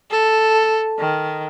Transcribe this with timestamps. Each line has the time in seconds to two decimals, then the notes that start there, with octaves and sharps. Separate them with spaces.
0.11 A4
0.99 D#3